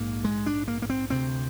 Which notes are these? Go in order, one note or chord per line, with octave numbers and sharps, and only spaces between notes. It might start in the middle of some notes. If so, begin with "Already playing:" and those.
Already playing: A#1 G#2 A#3
G#3
D4
A#3
A#3
C4
D2 C3 C4